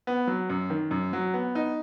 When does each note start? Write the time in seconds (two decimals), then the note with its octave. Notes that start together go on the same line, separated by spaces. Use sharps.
0.07 B3
0.27 F#3
0.50 F#2
0.70 D#3
0.91 F#2
1.13 F#3
1.34 B3
1.55 D#4